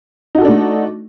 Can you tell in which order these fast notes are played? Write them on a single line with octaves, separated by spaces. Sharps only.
D#4 F#4 A4 D4 A3